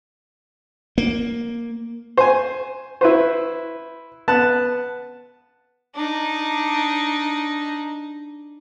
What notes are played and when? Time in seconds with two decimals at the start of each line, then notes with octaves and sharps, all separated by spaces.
0.98 A#3
2.17 C5 G#5
3.01 E4 B4 C5
4.28 B3 A5 F#6
5.96 D4 D#4